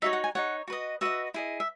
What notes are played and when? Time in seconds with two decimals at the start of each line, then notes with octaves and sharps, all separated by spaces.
0.02 D#4 F#4 C#5 E5
0.13 F#5
0.24 G#5
0.35 D#4 F#4 C#5 F#5
0.68 F#4 B4 D#5
1.01 F#4 B4 D#5 E5
1.34 E4 G#4 D#5
1.60 E5